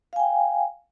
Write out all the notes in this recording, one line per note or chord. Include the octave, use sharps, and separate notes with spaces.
F5 G5 G#5